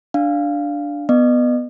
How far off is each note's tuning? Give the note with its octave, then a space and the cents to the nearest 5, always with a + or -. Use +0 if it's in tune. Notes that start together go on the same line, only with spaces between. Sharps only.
D4 +0 F5 +0
B3 +5 D#5 -40